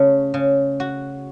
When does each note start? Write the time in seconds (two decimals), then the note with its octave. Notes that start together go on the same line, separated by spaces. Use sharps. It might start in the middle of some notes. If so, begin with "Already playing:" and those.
Already playing: C#3 A3
0.34 C#3
0.80 F#4